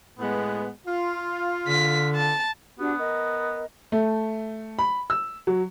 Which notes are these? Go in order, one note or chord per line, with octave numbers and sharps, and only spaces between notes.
A2 G#3 B3
F4
D3 B6
A5
B3 D4 F#4 G4
A#4 D#5
A3
B5
E6
F#3